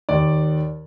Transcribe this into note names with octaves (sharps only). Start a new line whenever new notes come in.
D#2 D5